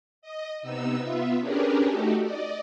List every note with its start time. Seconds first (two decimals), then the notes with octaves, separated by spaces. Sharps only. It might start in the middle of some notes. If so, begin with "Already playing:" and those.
0.22 D#5
0.62 C3 B3 D#4 E6
1.00 B3 F4 E5
1.39 C#4 D4 G4 G#4 A#4 B4
1.89 A3 D#4 F#4 G4 A4
2.21 D5 D#5